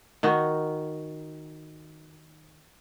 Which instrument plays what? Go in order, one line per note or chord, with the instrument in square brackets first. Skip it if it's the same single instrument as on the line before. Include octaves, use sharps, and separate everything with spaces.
[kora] D#3 D#4 F#4